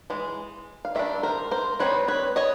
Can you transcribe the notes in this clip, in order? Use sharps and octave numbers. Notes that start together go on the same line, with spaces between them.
E3 G#3
F5
D#3 G3 D4 E5
A#4 C5
A#4 C5
G3 C4 D#4 B4 C#5
B4 C#5
C#5 D#5